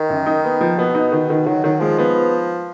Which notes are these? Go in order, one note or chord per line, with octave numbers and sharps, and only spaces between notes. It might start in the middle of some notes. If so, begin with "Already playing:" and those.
Already playing: D#3
F#2
D#4
B3
F3
B2 B3
D#4
D#3
D#3
D#3 F#3
D#3 F#3
F3 G#3
F3 B3